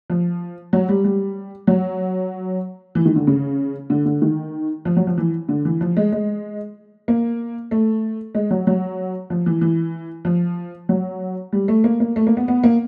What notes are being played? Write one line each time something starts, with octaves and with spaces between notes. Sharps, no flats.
F3
F#3
G3
G3
F#3
E3
D#3
D3
C#3
D3
D3
D#3
F3
F#3
F3
E3
D3
E3
F3
G#3
G#3
A#3
A3
G#3
F#3
F#3
F3
E3
E3
F3
F#3
G3
A3
A#3
A#3
A3
A#3
B3
B3
A#3